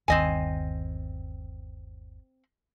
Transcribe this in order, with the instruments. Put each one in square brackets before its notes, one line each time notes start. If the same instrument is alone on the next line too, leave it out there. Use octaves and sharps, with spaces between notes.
[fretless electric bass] G1 D#2 D#3 [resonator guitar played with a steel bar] C4 D#5 G#5